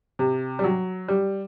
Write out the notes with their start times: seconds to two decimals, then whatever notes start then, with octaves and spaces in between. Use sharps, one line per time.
0.19 C3
0.59 G3
0.64 F#3
1.08 G3